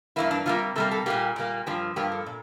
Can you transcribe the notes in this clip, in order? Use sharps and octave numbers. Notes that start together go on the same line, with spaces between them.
G2 E3 A#3 E4
D4
C3 G3 A#3 F4
C3 G3 A#3 A4
A4
A#2 G3 A#3 G4
A#2 G3 A#3
G2 F3 A#3 G4
G2 F3 A#3 G4
A4
A#2